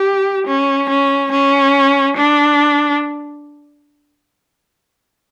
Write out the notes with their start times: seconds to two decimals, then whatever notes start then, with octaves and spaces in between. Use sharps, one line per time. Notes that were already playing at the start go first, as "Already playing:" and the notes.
Already playing: G4
0.47 C#4
0.89 C#4
1.32 C#4
2.17 D4